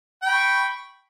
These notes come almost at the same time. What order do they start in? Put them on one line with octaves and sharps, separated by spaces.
G5 B5 C#6